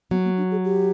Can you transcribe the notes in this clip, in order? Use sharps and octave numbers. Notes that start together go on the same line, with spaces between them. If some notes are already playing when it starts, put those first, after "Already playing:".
F#3 B3
A#3
D4
G#4
G4